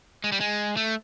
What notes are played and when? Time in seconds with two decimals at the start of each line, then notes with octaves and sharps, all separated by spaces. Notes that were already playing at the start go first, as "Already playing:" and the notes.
0.24 G#3
0.32 G3
0.41 G#3
0.77 A3